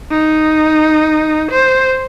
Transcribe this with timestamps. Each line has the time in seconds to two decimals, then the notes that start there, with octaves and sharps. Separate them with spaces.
0.11 D#4
1.52 C5